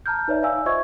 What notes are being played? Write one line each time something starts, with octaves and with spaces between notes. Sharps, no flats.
A5 A#5 F6 G6
D#4 B4 C#5 D5 E5
D5 F5 G#5 E6
F4 C5 D#5 E5 C#6 G#6